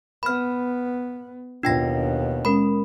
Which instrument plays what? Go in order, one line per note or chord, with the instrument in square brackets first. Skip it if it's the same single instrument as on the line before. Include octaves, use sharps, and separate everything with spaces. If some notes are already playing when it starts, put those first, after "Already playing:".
[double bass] B3 [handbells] B5 F6
[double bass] D#2 B2 [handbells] D4 G5 A#6 [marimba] F4
[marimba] G#3 C#4 [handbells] A#4 B5